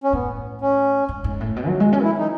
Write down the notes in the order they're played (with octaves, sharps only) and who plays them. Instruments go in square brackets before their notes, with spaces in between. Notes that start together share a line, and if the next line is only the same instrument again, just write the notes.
[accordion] C#4
[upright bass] A2 [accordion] B3
[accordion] C#4
[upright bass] G#2
G#2
A2
B2
F#3
G#3
C#4
[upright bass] E3 [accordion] E4
[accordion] D#4